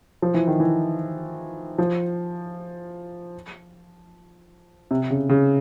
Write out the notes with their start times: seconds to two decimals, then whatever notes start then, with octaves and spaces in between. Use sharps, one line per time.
0.22 F3
0.34 E3
0.47 D#3
0.60 E3
1.78 F3
4.91 C3
5.10 C#3
5.29 C#3